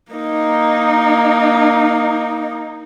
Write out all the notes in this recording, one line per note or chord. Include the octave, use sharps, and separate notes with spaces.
A#3 D#4